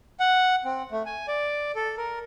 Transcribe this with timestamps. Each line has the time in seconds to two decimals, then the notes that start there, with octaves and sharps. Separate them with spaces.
0.20 F#5
0.65 C4
0.91 A3
1.06 G#5
1.28 D5
1.75 A4
1.98 A#4